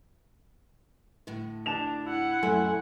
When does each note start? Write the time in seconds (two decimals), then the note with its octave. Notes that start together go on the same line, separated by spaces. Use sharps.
1.27 A2 D3
1.66 D4 A5 E7 F7
2.04 E4 F#5
2.43 F#2 A#2 A3 A4 G#5 C6